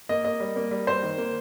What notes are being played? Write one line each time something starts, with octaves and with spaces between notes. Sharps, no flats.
A#3 D#5
A#3 D#5
G3
A#3
G3
A#3 C5
D#3
A#3